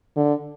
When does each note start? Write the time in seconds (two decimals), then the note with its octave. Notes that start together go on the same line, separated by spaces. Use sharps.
0.16 D3